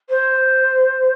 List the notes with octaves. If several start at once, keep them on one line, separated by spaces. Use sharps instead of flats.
C5